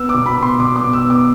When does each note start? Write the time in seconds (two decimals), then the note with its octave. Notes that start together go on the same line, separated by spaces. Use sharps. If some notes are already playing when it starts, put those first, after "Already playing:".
Already playing: B3 E6
0.09 D6
0.14 B2
0.26 B5
0.38 B2
0.43 C6
0.59 B2 D6
0.76 D6
0.81 B2
0.93 E6
1.05 B3
1.10 D6